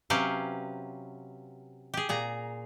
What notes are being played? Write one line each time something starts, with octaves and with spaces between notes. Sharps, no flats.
C3 F#3 C#4 G4 B4 F5
G4 G#4
A#2 G#4 A#5